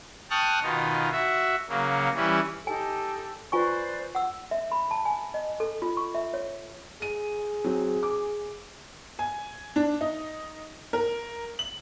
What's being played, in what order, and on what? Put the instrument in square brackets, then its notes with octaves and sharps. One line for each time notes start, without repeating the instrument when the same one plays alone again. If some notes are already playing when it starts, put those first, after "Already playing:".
[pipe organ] G5 A5 C#6 D#6 F6 F#6
B2 D#3 D#4 F4
F#4 E5
C#3 F#3 A#3
E3 G3 C#4 E4
[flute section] D#4 G4 A4 [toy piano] G#5
[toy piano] F4 G#5 C#6 [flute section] B4 C5 D5
[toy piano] F#5 E6
E5
B5
A5
G#5
D#5
A4
F4
C#6
E5
C#5
[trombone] G#4 [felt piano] D#7
[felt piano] F#3 C4
D6
[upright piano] G#5
D4
D#4
A#4
F#7